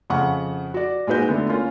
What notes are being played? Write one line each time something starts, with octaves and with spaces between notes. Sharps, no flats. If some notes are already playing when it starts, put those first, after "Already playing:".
F2 C#3 F#5 C#6
F#4 D5
A#2 G#3 D#4 F#4 B4 G6
D3 A3 B3
A#3 C#4 F4